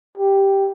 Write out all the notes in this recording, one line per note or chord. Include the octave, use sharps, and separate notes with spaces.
G4